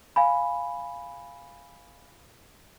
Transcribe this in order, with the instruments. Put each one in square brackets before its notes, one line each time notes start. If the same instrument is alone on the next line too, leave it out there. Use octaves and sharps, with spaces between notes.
[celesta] F5 G#5 B5